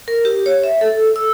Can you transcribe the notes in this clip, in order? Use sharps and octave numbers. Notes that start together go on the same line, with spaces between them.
A#4
G4
C#5
E5
A4
E6